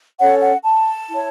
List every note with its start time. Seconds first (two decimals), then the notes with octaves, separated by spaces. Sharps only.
0.20 C#4 A4 C#5 F#5
0.42 F#5
0.65 A5
1.10 E4 C#5